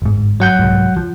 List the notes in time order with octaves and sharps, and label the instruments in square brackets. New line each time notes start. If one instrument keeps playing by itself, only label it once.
[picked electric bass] G1 G#2
[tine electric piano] F#3 F#5 G6
[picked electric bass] C2 G#2
F3